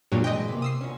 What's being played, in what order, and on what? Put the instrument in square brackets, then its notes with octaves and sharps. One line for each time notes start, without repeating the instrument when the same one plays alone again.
[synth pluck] G2 A#2 F#3
[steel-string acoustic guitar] G2 E3 G#3 [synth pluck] D#5 G5
[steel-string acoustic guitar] C3 A#3
[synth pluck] D#6 E6 C7
[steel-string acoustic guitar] D2 C#4